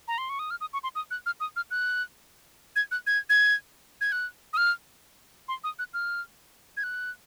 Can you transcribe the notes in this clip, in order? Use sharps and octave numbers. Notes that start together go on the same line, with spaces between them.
A#5
C6
C#6
D#6
F6
D#6
C#6
C6
D#6
F#6
F6
D#6
F6
F#6
G#6
F#6
G#6
G#6
G#6
F#6
D#6
F6
C6
D#6
F#6
F6
G#6
F#6